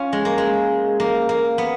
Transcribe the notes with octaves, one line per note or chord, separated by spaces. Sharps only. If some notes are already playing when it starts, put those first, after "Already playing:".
Already playing: C#4 F4
G#3
A#3
G#3
A#3
A#3
B3